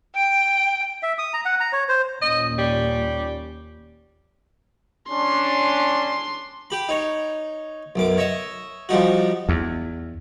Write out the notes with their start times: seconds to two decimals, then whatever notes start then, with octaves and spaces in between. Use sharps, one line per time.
0.16 G5 D7
1.03 E5
1.19 D#6
1.33 A#5
1.45 F#5
1.60 A#5
1.73 C#5
1.89 C5
2.22 D#2 A#2 C#4 D#5
2.58 G3
5.09 C#4 D4 C6
6.70 G4 B5
6.89 D#4 C#5
7.96 B1 F#2 D6
8.17 C#5 D#5 E5
8.89 F3 G3 D#4 F#4
9.49 E2